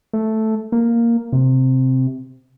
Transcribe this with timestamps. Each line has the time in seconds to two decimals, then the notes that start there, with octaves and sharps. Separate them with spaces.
0.13 A3
0.72 A#3
1.32 C3